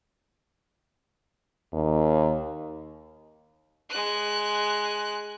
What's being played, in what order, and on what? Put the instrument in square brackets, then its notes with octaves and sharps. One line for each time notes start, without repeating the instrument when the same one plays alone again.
[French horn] D#2
[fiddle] G#3 F#6